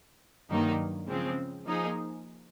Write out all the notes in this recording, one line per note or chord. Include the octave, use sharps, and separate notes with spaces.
G2 D#3 F#3 A#3 D#4
C#3 F3 G#3 C4
F3 A#3 D#4 G#4